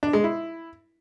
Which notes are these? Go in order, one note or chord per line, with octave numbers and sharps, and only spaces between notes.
D4
G#3
E4